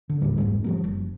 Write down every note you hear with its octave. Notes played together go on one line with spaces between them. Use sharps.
D3
D1 D2 A2 G3
F1 E2 G#2 G#3
F3 G3 A#3
F#1